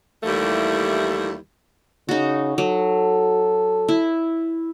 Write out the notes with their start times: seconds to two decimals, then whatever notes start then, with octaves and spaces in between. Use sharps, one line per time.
0.24 D#2 E3 F3 G3 A3 E4
2.09 C#3 D#4 F#4
2.58 F#3 A4
3.89 E4